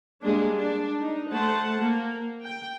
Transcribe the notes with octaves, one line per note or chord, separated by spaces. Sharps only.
G3 G#3 A#3 D4
D4
D#4
A3 C5 F#5 A5
A#3
G5